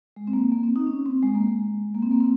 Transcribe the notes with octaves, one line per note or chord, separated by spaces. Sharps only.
G#3
C4
A#3
A#3
C4
D#4
C#4
C4
G#3
A#3
G#3
A#3
C4
A#3
C4